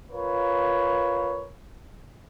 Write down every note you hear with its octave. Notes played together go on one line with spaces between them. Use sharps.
F4 A#4 B4 C#5